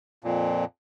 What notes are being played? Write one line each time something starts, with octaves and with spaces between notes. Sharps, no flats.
F2 A#2